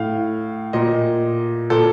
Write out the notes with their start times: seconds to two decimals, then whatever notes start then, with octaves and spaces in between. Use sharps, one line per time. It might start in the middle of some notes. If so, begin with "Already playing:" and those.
Already playing: A2 F5
0.73 A#2 D#5
1.70 A#2 A4